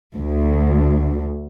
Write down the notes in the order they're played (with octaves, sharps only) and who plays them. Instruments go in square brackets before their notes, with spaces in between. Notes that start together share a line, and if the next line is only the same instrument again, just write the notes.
[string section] D2